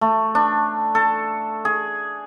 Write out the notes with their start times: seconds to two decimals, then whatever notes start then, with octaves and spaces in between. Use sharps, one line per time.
0.01 A3
0.35 D4
0.95 A4
1.65 G#4